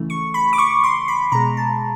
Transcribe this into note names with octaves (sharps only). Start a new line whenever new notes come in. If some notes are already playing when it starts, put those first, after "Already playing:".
Already playing: C#3 E3 A3
C#6
B5
D6
C#6
C6
B5
B2 G#3 A#5
A5